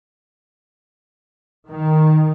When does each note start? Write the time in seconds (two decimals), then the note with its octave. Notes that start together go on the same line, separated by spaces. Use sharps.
1.69 D#3